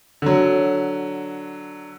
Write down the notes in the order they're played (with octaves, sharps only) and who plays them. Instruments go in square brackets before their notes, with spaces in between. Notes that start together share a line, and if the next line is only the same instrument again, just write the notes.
[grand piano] D3 F#3